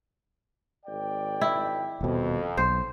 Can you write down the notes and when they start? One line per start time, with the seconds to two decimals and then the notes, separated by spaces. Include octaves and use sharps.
0.86 G#1 D5 G5
1.41 E4
2.01 D#1 F2 B2
2.57 B1 C5